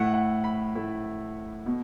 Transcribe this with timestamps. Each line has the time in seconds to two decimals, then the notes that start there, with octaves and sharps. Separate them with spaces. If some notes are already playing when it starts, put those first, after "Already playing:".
Already playing: A2 A3 E4 F#5
0.14 F#5
0.44 B5
0.75 A2 A3 E4
1.66 B2